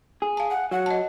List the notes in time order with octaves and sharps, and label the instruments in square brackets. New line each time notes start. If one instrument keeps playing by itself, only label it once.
[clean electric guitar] G#4
[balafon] F5 A5
[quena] F#5
[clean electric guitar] F#3 [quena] F#5
[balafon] D#5 A5